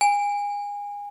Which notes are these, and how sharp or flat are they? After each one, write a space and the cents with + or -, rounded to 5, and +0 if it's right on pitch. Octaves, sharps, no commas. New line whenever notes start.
G#5 -25